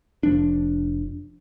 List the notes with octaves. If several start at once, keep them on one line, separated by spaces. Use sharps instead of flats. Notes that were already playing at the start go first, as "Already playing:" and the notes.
F1 F3 D4